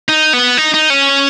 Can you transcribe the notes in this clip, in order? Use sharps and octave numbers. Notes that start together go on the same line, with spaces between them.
D#4
B3
D#4
D#4
C#4